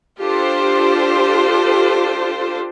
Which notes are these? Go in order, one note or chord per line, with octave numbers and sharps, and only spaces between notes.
D4 F4 G4 A4 C5